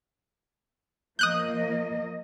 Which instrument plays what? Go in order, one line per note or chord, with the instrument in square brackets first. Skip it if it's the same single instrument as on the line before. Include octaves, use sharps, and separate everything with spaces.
[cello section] F3 A#3 D#5 [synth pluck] D#6 F#6 G6